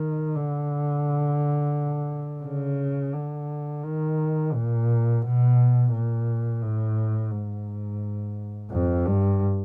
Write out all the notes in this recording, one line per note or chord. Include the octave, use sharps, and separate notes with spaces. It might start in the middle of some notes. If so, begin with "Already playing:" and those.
Already playing: D#3
D3
C#3
D3
D#3
A#2
B2
A#2
A2
G#2
F2
G2